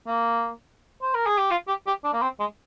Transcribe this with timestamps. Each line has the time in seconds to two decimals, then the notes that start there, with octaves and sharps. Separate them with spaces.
0.07 A#3
1.02 C5
1.14 A#4
1.26 G#4
1.38 G4
1.50 F4
1.68 G4
1.87 G4
2.04 D4
2.13 A#3
2.22 C4
2.40 G#3